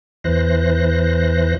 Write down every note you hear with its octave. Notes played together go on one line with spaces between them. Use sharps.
E2 E3 C5 F#6 A#6